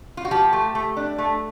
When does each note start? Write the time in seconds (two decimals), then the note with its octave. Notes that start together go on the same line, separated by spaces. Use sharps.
0.17 F4
0.25 F#4
0.31 F3 G4
0.53 A3
0.75 A3
0.97 D4
1.18 A3